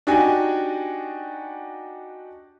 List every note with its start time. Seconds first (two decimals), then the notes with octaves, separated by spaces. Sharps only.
0.07 D4 D#4 F#4 G4 G#5